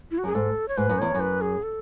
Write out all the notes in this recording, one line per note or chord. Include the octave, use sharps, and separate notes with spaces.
E4
F#4
F#2 G#4
G#2 A4
C#5
G#2 B4
F#2
E2 C#5
F#2
B4
G#4
A4